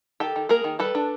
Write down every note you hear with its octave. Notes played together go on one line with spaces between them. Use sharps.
D#3 G4 A4
D#3
A#3 G#4 A#4
D#3
G3 A4 B4
D4